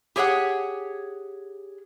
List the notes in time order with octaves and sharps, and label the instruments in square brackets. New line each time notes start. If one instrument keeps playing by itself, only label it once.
[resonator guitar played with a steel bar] G4 G#4 C#5 E5 F#5